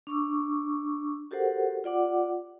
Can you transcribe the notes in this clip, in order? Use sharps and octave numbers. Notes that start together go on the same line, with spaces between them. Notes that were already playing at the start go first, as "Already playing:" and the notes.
D4 C#6 D6 E6
F#4 G4 A4 A#4 C5 F#5
F4 D5 F#5 D6